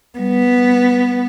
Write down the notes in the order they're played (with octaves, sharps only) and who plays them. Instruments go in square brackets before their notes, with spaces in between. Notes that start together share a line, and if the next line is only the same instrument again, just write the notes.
[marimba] G3 [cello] B3